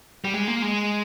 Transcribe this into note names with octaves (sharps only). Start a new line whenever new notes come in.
G3
G#3
A#3
G#3